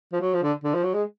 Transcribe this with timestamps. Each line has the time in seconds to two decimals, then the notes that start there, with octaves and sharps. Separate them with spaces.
0.12 F3
0.21 F#3
0.34 F3
0.43 D3
0.64 D3
0.74 F3
0.83 F#3
0.94 G#3